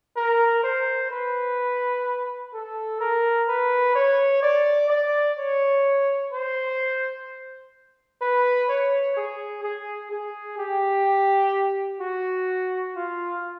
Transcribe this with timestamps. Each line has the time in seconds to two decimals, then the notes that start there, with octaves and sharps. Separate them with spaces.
0.16 A#4
0.63 C5
1.11 B4
2.54 A4
3.00 A#4
3.48 B4
3.95 C#5
4.43 D5
4.89 D5
5.37 C#5
6.32 C5
8.21 B4
8.69 C#5
9.16 G#4
9.63 G#4
10.11 G#4
10.58 G4
12.00 F#4
12.95 F4